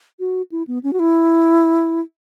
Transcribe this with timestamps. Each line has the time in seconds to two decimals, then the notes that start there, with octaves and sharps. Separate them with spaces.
0.20 F#4
0.52 E4
0.67 B3
0.83 C#4
0.93 F#4
0.99 E4